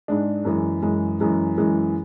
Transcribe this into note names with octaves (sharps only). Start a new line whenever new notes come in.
G#2 G#3 D4
F#2 E3 G#3
F#2 E3 G#3
F#2 E3 G#3
F#2 E3 G#3